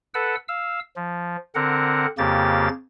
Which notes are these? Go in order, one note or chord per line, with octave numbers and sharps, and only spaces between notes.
A4 B4 F#5 E6
F5 E6
F3
D3 C4 A#4 F#5
F2 C#3 A#3 G4 A6